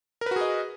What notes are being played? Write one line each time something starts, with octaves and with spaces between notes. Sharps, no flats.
F#4 G#4 A#4 B4 D#5